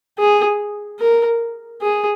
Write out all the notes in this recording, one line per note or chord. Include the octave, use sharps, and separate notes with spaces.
G#4
A#4
G#4